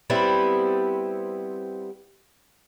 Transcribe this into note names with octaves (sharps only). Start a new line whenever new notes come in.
G3 B3 C4 E4